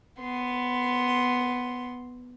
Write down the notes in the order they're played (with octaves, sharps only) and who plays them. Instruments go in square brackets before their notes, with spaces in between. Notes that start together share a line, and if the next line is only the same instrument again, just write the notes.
[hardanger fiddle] B3 C6